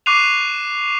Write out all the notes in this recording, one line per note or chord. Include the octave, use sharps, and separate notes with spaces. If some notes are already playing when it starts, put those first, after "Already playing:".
C#6 D6 F#6 C7 D#7 F7